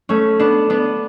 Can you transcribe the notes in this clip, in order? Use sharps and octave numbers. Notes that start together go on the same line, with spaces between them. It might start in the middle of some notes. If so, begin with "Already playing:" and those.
A3 C#4
B3 D4
B3 D4